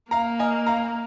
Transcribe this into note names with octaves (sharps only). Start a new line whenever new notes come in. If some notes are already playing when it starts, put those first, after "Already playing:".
A#3 F5 A#5
D#5 G#5
F5 A#5